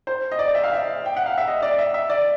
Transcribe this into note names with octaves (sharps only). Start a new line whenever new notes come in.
C5
D#5
D5
E5
F5
E5
G5
F#5
F5
E5
D#5
D5
E5
E5
D5